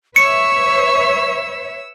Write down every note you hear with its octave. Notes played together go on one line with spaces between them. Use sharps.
B4 C#5 E5 C#6 E6 C#7